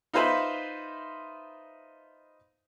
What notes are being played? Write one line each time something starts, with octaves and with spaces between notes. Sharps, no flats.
D#4 F4 B4 C5 E5 B5